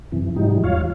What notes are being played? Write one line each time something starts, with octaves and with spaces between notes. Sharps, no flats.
F#2 C3 E3
G#2 E3 F#3 G3 D#4
E2 F4 C#5 F5